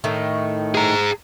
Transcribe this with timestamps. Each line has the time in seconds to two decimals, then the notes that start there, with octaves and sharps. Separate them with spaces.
0.04 A2 D#3 A3
0.75 G#4 A#5